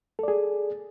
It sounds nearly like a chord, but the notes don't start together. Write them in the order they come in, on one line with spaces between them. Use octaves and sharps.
A4 D5 G#4